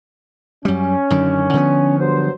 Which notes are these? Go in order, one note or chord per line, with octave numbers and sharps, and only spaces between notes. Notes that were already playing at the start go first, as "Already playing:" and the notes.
F#2 G3 C#4
F#2 D3 D#3
D3 F3 B3
G2 F#3 C5